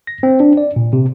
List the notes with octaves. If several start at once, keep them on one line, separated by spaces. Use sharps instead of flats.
A#6
C4
D4
D5
A#2
C3